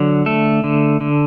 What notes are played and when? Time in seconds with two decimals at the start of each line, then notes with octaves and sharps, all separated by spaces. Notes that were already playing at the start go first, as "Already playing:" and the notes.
Already playing: D3 F#3
0.26 A3 A4
0.64 D3
1.01 D3